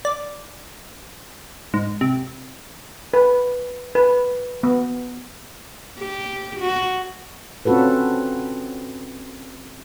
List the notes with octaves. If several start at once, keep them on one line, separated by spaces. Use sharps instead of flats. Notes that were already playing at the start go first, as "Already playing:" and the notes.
D5
G#2
C3
B4
B4
B3
G4
F#4
C4 C#4 F4 F#4 A4 B4